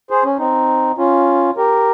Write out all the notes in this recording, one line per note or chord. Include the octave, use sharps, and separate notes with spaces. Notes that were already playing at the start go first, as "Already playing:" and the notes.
G#4 C5
C#4
C4 D#4
C#4 F4
G4 A#4